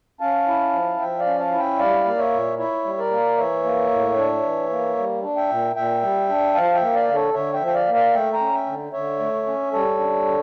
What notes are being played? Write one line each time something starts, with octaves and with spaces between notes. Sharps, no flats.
C#4 F5 A5
E4
F3
F3 E5 G5
D5 F5
C#4
F5 A5
E4
E5 G5
G3 D5 F5
A#3
C#5 E5
A#2
E4 C#5 E5
G3
A#4 D5
A#3
E3 C#5 E5
A#3
A2
D4
E3
A#3
G3
D4
E5 G5
A#2
A#2 E5 G5
G3
D4
F3 F5 A5
E5 G5
A#3
D5 F5
D3
A4 C#5
D3 C#5 E5
E5 G5
F3
G5
D5 F5
A#3
D5 F5
A3 E5 G5
G5 A#5
C#4
E5 G5
D3
D3 C#5 E5
A3
C#4
G3 A4 C#5
D4
D3